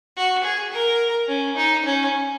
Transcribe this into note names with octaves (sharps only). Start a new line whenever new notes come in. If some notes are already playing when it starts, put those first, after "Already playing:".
F#4
G#4
A#4
C#4
D#4
C#4